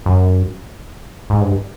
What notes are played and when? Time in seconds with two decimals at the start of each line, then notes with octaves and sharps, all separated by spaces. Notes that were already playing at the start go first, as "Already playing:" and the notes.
0.06 F#2
1.30 G#2
1.41 G2